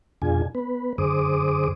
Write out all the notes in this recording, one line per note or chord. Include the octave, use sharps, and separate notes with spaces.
F2 B2 D4 F4 G#4 G#5
B3 B4
F#2 D3 G#4 C5 D6 D#6